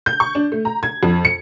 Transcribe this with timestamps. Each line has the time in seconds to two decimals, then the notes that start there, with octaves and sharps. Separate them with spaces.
0.06 G6
0.20 C#6
0.35 D4
0.52 A3
0.65 A#5
0.83 G#6
1.03 F2
1.25 C#7